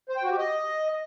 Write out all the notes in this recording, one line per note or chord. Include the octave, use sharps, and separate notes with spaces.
C5
G5
F#4
G4
D#5